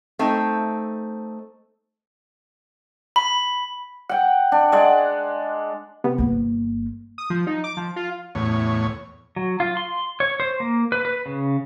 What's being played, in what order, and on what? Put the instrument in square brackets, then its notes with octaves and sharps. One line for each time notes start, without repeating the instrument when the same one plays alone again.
[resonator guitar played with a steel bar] A3 C4 D#4
[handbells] B5
[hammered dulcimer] F#5 G5
D4
G#3 D5 F#5
[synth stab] C3 B3
[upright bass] G1 A#3
[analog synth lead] D#6
F3
D#4
D6
F3
F4
[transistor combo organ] E2 A2 C#5
[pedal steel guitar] F#3
F4
C6
C#5
C5
A#3
B4
B4
C#3